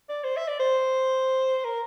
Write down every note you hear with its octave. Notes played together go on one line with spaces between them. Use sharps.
D5
C5
E5
D5
C5
A#4